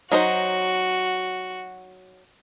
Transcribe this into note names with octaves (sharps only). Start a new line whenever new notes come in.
F#3 D#4 F#4 C5